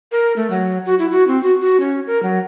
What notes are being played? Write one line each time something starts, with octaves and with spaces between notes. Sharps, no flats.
A#4
A3
F#3
F#4
E4
F#4
C4
F#4
F#4
C#4
A#4
F#3